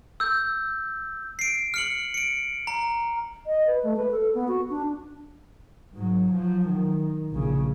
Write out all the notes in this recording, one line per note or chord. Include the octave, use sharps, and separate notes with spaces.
E6 G6
C7 D7
F6 C#7 F#7
C#7 D7
A#5
D#5
B4
A3
B4
A4
B3
F#4
D4
G#2 F#3
F3 F#3
D#3
A#1 C#3